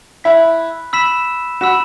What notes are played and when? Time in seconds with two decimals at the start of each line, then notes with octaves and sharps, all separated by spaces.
0.24 E4 B5 F#6 B6
0.93 B5 E6 B6 E7
1.61 F#4 B5 E6 B6 E7